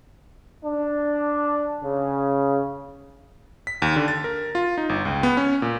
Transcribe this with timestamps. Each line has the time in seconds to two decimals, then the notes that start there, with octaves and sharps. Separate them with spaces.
0.65 D4
1.83 C#3
3.67 B6
3.82 D#2
3.96 D3
4.08 A6
4.24 A#4
4.55 F4
4.77 D#4
4.89 G1
5.05 C#2
5.23 B3
5.37 C#4
5.62 A#2